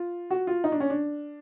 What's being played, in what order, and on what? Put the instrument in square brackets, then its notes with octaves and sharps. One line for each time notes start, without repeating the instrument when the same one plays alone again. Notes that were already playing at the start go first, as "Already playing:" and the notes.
Already playing: [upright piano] F4
F#4
F4
D#4
D4
C#4
D4